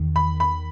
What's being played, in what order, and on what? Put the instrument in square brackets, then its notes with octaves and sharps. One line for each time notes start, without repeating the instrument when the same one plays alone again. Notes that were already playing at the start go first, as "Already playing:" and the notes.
Already playing: [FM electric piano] E2 D#3
[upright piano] B5
B5